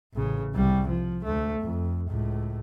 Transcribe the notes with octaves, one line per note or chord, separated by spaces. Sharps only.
A1 C#3
C2 G3
F3
D2 A3
F2
C#2 A2